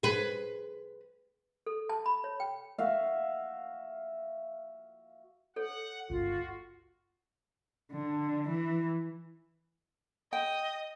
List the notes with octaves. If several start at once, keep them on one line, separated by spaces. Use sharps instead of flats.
G#4 B4
A4
A5
B5
C#5
G5
F#4 E5 F5
A4 C#5 F#5
G1 C#2 F4 F#4
D3
E3
D#5 G5